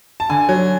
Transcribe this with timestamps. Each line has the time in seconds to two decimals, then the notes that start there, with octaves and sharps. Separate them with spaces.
0.20 A5
0.30 D3 G#5
0.49 F#3